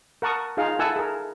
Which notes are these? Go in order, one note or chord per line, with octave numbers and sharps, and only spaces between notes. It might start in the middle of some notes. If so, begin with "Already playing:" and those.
A#4 F#5 A5 C#6 D#6
D#4 F4 G#4 F5
E4 A4 F#5 G#5 A5 E6
G#4 A#4